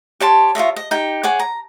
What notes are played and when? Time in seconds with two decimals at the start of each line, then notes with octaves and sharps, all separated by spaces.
0.20 G4 C#5 A5 C6
0.55 F4 C#5 D#5 E5
0.76 D#5
0.91 D#4 G4 G5
1.23 G#4 C#5 F#5 D6
1.39 A#5